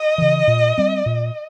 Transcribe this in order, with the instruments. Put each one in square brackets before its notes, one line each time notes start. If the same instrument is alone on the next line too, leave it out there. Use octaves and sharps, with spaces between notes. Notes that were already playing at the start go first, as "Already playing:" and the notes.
Already playing: [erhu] D#5
[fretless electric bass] C#3 E3
A#2
G3 C4
A#2